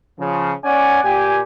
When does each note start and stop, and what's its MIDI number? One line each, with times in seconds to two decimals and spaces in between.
0.19 0.52 49
0.19 0.52 53
0.64 1.03 61
0.64 1.03 74
0.64 1.03 78
0.64 1.03 80
1.04 1.41 46
1.04 1.41 67
1.04 1.41 80